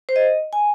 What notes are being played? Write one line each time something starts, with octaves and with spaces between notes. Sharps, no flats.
C5
D#5
G#5